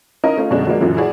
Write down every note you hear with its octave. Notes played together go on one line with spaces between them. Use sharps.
C#4 D#4 E4 A#4 D#5 F5
A3 C#4 F4
F#2 B2 D3 G#3 C#4 D4
F#3 G#3 A#3 D4
F#2 A#2 D3 E3 F#3
E4 F#4 G#4 C#5 D5